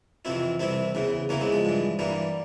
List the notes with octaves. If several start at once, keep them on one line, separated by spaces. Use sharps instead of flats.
F2 C3 E3 C4 E4
C2 C3 E3 C4 E4
E2 C#3 E3
E2 C#3 E3 A#3 C#4
G#3 C4
F3 G#3
G2 E3
G2 E3 G3 A#3